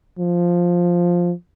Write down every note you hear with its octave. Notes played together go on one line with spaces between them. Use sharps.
F3